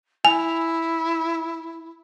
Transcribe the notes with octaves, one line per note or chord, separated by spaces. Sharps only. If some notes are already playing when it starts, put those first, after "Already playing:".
E4 G#5